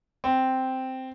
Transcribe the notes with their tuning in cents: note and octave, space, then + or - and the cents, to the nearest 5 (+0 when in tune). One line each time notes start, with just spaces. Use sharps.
C4 -5